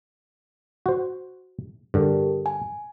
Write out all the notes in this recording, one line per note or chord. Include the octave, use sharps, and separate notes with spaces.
F#4 C5
G2 D3 G4 A4 A#4
G#5